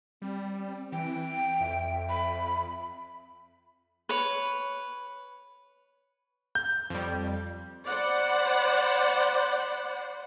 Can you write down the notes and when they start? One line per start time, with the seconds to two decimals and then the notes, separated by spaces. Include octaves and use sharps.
0.22 G3 C4
0.92 E3 G5
1.60 F2 E5
2.09 B5
4.09 B4 C#5
6.55 G6
6.90 F2 G3
7.86 C5 D5 F#5 B5